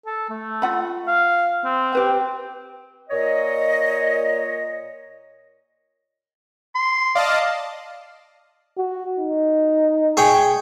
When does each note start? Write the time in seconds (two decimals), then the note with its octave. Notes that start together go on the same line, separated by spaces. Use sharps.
0.06 A4
0.30 A3
0.62 F4 F#5 B5
1.08 F5
1.65 C4
1.93 G4 B4 G5
3.10 A#2 C#5 D#5
6.75 C6
7.15 D5 D#5 F5 A5
8.77 F#4
9.19 D#4
10.17 G#4 C#5 G5